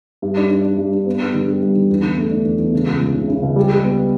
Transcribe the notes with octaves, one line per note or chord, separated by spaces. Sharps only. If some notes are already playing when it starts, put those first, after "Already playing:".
G2
D4
D4
D4
G2
D4
B3
G2
D3
G3
G2
D3
E2
D3
A3
D4
E2
E2
C#3
C#2
C#2
C#3
C#3
C#2
G3
G3
B3